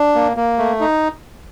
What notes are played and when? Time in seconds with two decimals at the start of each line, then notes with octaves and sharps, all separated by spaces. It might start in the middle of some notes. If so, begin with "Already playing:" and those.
Already playing: D4
0.15 A#3
0.37 A#3
0.58 A3
0.80 D#4